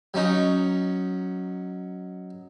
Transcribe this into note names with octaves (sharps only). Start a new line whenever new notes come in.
F#3 C#4 D#4